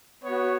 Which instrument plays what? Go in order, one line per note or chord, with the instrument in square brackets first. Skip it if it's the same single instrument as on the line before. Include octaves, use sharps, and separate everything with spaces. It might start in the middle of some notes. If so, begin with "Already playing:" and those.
[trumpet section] B3 F#4 C#5